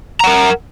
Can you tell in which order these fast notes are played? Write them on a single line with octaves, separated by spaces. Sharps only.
A#5 F#5 A#4